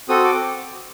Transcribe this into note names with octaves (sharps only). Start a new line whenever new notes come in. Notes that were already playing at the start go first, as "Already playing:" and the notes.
C4 F#4 A4 D#6
D6